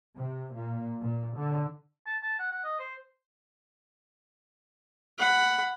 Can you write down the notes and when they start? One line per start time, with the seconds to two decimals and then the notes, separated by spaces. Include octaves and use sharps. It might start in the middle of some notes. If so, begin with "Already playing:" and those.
0.17 C3
0.54 A#2
1.02 A#2
1.37 D3
2.06 A5
2.23 A5
2.39 F#5
2.52 F#5
2.64 D#5
2.79 C5
5.19 F#5 B5